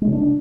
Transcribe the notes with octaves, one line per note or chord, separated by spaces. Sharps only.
G#3
C#3
D4